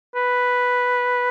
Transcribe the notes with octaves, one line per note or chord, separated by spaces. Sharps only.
B4